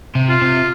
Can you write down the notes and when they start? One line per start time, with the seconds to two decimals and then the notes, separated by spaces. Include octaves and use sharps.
0.15 C3
0.29 F4
0.42 C3